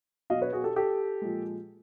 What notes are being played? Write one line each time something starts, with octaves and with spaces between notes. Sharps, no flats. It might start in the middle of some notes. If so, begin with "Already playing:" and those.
B2 F#3 D#5 F5
B4 C#5
F#4 G#4
G4 A4
G4 A4
A#2 F3 G#3